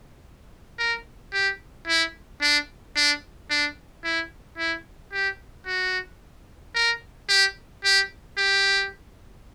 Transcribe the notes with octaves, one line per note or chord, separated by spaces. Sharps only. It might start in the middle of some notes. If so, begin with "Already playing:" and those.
A#4
G4
E4
D4
D4
D4
E4
E4
G4
F#4
A#4
G4
G4
G4